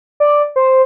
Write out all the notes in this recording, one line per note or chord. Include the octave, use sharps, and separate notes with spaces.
D5
C5